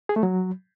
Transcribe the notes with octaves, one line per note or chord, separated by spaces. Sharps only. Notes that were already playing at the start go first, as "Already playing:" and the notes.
G#4
A3
F#3